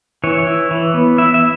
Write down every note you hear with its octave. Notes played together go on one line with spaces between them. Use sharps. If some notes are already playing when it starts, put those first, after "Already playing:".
E3 C#5
E4
E3
B3
E4 E5
E5